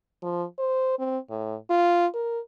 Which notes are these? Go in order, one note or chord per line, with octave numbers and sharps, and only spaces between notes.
F3
C5
C4
A2
F4
A#4